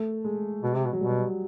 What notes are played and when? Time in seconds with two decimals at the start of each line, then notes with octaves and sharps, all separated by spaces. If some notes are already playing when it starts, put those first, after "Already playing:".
Already playing: A3
0.25 G#3
0.63 B2
0.74 C3
0.85 B2
0.93 F#3
1.01 B2 G3